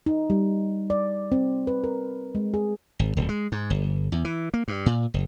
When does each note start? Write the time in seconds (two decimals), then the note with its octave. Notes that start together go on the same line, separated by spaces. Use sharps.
0.06 D#4
0.30 G3
0.90 D5
1.32 C4
1.67 B4
1.84 A#4
2.35 G#3
2.54 G#4
2.99 G#1
3.17 D1
3.29 G#3
3.52 G#2
3.70 G1
4.12 E2
4.25 E3
4.54 A#3
4.68 G2
4.86 A#2
5.14 F#1